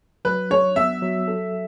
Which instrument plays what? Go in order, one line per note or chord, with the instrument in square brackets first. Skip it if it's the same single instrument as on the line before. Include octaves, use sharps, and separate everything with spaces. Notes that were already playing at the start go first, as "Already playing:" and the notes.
[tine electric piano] F#3 [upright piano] B4
[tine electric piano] D4 [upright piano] C#5
[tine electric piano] B3 [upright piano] E5
[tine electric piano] F#3
A4